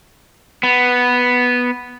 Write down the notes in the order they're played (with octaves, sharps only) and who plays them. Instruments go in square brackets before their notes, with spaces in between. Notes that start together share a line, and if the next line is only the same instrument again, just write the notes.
[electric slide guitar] B3